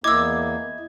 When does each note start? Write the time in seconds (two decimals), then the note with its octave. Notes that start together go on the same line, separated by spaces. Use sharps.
0.04 E2 A#3 E4 D#5 D6 E6 G#6